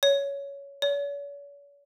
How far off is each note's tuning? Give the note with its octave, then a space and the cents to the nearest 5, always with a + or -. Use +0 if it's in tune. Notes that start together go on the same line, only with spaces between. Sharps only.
C#5 +15
C#5 +45